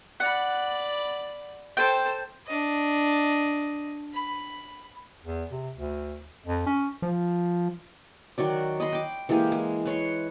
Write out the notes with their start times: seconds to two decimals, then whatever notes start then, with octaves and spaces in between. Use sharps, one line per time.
0.20 D5 F#5 B5
1.77 A4 C5 G5
2.47 D4 D#5
4.14 B5
5.23 E2
5.51 C3
5.74 D2
6.46 F2
6.67 C#4
7.02 F3
8.38 D#3 F#3 F#4 D5
8.80 D#5 B5 C6
8.92 G5 D6
9.29 E3 G#3 A#3 G4
9.52 G#3
9.85 B4 C#5 C6